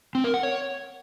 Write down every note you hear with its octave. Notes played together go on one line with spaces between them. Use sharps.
C4
A#4
F#5
C#5